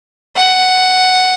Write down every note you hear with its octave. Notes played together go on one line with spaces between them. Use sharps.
F#5